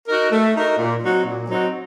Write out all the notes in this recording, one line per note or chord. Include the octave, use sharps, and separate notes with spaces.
D#4 F#4 A#4
A3
D#4 F#4 A#4
A#2
F#3 C4 D#4 F#4
A#2
F#3 C4 D#4 F#4